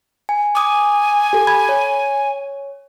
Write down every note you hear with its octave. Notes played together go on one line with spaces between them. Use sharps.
G#5
G#5 D6 D#6
G4 A4
B5 G#6
C#5